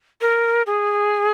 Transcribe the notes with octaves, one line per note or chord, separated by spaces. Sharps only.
A#4
G#4